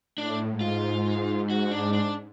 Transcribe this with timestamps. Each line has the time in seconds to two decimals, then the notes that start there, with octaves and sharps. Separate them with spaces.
0.17 A2 D4
0.51 G#2
0.61 F4
1.50 F#4
1.71 D4
1.93 D4